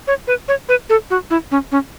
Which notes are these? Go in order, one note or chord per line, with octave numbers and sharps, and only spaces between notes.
C#5
B4
C#5
B4
A4
F#4
E4
C#4
C#4